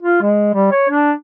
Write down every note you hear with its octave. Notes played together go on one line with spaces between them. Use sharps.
F4
G#3
G3
C#5
D4